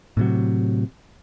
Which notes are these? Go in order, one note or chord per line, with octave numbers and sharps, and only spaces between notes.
A2 C3 F#3